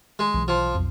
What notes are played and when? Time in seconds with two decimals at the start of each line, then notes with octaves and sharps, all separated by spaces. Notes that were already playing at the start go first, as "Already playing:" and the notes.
0.19 G#3
0.34 B1 E3
0.48 F3
0.75 B1 F2